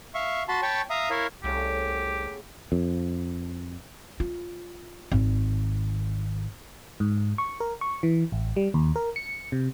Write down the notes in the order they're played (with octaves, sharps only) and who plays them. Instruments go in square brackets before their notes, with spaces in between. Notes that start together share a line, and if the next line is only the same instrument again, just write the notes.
[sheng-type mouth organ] E5 F5 C#6
F#4 A5 B5 C6
C#5 G5 A5 B5 C#6
E5 F5 A#5 D#6
E4 A#4 C#5 E5 F5
[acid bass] C2 [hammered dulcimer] C#3 A3 F#5 [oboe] G4
[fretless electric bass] F2
[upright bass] F4
G#1
[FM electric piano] G#2
C#6
A#4
C#6
E3
A1
G3
D#2
A#4
C#7
C3